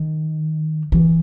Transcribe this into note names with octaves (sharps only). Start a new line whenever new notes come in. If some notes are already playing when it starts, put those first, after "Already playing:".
Already playing: D#3
E3